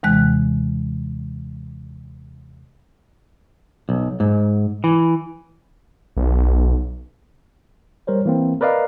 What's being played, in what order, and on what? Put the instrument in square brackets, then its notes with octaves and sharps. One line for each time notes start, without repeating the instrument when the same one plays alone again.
[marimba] D#2 C3 E3 G#3 F#6
[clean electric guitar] B1
G#2
E3
[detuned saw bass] B1
[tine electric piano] G3 A#4 C5 C#5
E3 A#3 C4
A#4 B4 D5 D#5 F5 A#5